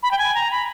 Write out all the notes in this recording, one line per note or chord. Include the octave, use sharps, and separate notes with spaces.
B5
G5
G#5
A#5
B5